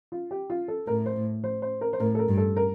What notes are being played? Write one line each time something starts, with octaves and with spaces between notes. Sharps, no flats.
F4
G4
F4
A4
A2 A#4
C5
C5
C5
A#4
C5
A2 A#4
A4
A#4
G2
A4
A#4